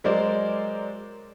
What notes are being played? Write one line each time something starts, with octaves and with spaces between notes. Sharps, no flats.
F#3 G#3 A#4 C5 D5